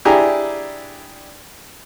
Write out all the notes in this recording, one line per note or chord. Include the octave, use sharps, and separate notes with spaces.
D4 E4 G4 G#4 G#5 A#5